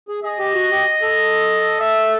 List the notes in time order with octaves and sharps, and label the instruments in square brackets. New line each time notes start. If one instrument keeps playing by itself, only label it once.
[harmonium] G#4
[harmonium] G#4 [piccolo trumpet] D#5
[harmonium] G4
F#4
G4
A4
[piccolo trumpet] E5